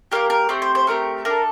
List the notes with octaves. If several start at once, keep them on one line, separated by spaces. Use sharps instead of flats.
A#3 D4 G4 A#4
A#4
A3 C4 G4
C5
C5
A3 C4 G4 A#4
D4 A4 A#4